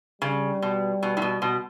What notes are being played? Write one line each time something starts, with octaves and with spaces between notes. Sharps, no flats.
C#3 G3
B2
B2
A2
B2
B2